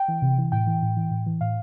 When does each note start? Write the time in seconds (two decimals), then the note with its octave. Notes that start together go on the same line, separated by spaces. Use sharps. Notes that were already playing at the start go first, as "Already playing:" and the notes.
Already playing: G5
0.08 E3
0.22 C3
0.38 E3
0.52 A2 G5
0.67 E3
0.82 A2
0.97 E3
1.11 A2
1.26 E3
1.41 A2 F5